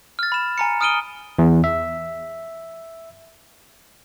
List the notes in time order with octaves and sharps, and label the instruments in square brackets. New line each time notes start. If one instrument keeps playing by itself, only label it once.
[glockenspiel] F6 A6
B5 E7
G#5 A#5 C#7
D#6 F6 D7 D#7 G7
[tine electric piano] E2
E5